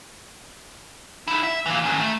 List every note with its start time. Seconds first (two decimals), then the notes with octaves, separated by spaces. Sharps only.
1.28 D#4 E4
1.43 E5
1.66 E3 A#3
1.84 D#3 C#4
2.00 A3